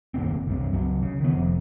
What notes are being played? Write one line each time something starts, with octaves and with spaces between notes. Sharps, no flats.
F#1 D#2 A#2 C4
C2 G2 C3
C#2 F#3
C#3
D#3 B3
F1 F2